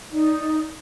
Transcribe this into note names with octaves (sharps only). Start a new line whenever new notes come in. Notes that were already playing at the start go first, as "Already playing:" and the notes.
D#4 D5